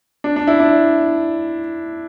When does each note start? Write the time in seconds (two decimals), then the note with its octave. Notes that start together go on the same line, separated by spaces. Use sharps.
0.24 D4
0.36 D4
0.47 E4
0.60 D4